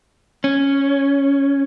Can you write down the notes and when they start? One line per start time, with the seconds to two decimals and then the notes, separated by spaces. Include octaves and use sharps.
0.44 C#4